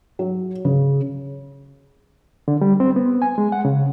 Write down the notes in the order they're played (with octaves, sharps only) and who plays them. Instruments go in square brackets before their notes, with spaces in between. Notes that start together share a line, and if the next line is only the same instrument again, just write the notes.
[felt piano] F#3
C#3
[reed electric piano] D3
G3
C4
B3
G#5
G#3
F#5
C#3